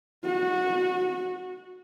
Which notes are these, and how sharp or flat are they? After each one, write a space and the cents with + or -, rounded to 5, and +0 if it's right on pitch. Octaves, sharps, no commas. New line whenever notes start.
F#4 -20